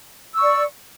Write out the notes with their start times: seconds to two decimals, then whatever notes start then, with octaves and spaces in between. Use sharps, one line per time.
0.33 E6
0.37 C#6
0.41 D5